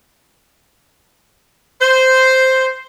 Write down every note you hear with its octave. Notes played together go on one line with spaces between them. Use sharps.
C5